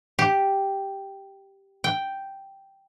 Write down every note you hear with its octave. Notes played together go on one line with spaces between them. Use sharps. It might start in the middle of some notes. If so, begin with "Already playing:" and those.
G4
G5